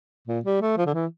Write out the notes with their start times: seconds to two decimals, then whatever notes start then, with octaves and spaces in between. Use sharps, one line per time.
0.28 A#2
0.45 G3
0.61 A3
0.77 F3
0.86 D3
0.94 E3